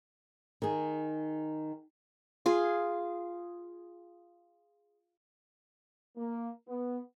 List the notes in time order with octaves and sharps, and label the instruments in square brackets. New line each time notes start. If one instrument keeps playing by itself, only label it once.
[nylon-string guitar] D#3 G#4
[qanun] F4 G#4
[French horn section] A#3
B3